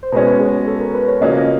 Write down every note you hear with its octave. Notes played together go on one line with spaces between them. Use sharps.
C5
B2 G#3 C#4 B4
G#4
A4
A#4
B4
C#5
C#3 F3 A#3 C#4 F#4 D#5
D5
D#5